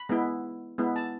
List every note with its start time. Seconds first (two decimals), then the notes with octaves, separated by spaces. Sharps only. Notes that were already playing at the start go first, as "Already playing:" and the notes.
Already playing: B5
0.09 G#3 B3 E4
0.78 G#3 B3 E4
0.96 A5